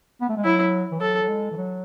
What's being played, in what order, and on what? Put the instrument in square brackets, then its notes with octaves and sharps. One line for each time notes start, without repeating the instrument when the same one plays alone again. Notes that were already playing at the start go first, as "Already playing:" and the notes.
[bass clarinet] B3
A3
G#3
[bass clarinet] F#3 [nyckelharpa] E4
[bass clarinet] E3
[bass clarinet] F#3 [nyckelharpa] A4
[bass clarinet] F#3
G#3
E3
F#3